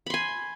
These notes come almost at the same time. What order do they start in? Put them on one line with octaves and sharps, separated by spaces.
B5 C6 G#5